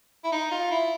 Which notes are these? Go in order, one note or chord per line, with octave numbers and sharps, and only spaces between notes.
E4
D#4
F4
E4